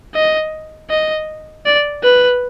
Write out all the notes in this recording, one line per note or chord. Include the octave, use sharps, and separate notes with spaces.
D#5
D#5
D5
B4